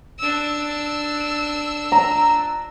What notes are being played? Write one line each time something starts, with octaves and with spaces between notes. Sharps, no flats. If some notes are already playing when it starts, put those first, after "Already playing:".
D4 E6
A#5